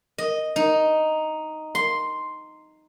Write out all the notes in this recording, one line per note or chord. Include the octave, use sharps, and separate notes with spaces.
D#5
D#4
C6